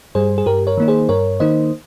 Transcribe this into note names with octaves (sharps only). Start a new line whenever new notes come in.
G2 G3 G#4 C5
G#4
G2 G4 A#4
A#4 C#5
D#3 A#3 D#4
G#4 C5
G2 A#4 C#5
D#3 A#3 D#4 C5 D#5